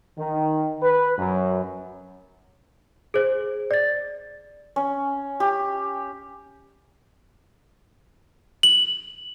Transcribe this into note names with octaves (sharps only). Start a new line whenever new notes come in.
D#3
B4
F#2
G#4 C5
D5 A6
C#4
G4
F#7